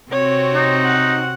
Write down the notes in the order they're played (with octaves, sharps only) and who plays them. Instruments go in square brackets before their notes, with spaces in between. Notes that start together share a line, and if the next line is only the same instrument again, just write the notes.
[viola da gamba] C3 C4 F#4 [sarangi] C#5
[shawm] D#4
[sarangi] F#5